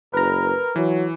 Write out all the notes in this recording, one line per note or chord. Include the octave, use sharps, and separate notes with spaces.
F#1 A#4 B4 A#5
E3 F#3